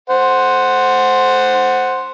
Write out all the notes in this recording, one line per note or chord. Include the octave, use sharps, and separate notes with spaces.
C5 F#5